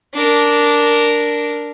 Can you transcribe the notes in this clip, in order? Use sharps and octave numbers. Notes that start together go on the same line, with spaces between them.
D4 A#4